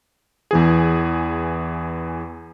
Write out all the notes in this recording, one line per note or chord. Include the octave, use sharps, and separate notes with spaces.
E2 E3 G#4